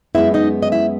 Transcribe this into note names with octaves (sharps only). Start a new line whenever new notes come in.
F#2 E3 G#3 B3 E4 E5
D#4 D#5
D#5
E4 E5